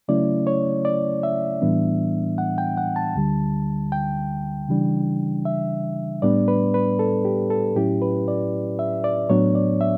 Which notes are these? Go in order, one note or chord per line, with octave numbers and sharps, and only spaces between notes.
C#3 F#3 A3 C#4 E4 D5
C#5
D5
E5
A2 E3 G3 B3 D4
F#5
G5
F#5
A5
D2 D3 G3
G5
C#3 E3 G3 D4
E5
A2 G3 B3 D4 D5
B4
B4
A4
G4
A4
A2 F#3 C#4 E4 G4
B4
D5
E5
D5
A2 F#3 B3 D4 C#5
D5
E5